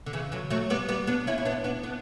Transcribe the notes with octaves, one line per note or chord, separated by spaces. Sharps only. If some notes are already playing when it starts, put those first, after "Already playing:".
D3
C#3 E3
D3 F#3
F#3 A3
G3 B3
G3 B3
B3 D4
C#4 E4
E4
B3 D4
B3 D4
B3 D4